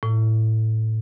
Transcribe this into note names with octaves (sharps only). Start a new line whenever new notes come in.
A2